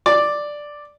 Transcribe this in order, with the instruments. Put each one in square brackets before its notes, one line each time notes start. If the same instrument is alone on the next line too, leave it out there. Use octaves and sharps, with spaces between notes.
[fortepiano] D5